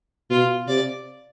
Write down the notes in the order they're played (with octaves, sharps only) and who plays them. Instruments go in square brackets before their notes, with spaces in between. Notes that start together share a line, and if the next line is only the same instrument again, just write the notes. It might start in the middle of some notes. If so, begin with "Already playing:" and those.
[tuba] B2 [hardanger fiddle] F4
[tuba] C3 [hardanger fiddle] D5